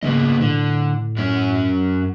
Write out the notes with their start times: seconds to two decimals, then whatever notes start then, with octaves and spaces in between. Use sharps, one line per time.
0.03 C#3 A#3 B3 D#5
0.41 A2 D3
1.17 F#2 C#4 C#5